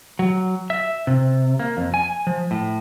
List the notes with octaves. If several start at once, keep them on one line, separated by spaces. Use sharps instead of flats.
F#3
E5
C3
A#3
F2
G#5
F3
A2